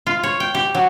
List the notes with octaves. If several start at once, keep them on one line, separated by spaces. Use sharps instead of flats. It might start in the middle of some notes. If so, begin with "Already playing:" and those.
F4
C#5
G5
G4
F#3